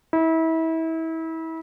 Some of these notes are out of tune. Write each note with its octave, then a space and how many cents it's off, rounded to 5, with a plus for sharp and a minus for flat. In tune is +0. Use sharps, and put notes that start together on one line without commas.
E4 -30